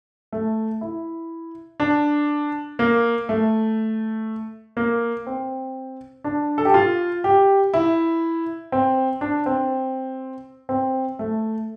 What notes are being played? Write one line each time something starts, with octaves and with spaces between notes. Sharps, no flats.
A3
E4
D4
A#3
A3
A#3
C4
D4
A4
G4
F4
G4
E4
C4
D4
C4
C4
A3